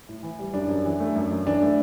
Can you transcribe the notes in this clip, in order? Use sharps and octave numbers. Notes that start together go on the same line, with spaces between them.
A2
E3
G3
F#2 D4
F#2
E3
A3
F#2
F#2
E3 D4
A3